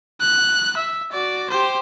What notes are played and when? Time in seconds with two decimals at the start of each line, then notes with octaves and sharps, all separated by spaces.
0.21 F#6
0.77 E5
1.12 F#4 D5
1.50 G4 C5